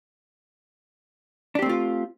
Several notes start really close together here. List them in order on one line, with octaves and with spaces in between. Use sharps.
D4 G4 C4 A3 F4